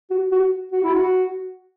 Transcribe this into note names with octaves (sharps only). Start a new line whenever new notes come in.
F#4
F#4
F#4
E4
F#4